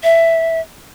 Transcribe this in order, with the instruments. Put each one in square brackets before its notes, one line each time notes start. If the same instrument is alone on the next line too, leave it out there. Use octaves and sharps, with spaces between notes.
[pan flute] E5